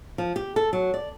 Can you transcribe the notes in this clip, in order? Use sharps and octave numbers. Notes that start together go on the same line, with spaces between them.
F3
G4
A4
F#3
D5